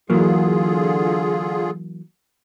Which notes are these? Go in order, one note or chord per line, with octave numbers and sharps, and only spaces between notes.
D3 E3 F#3 A#3 F4 G#4